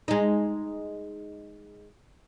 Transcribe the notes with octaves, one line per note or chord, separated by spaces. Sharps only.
G#3 D#4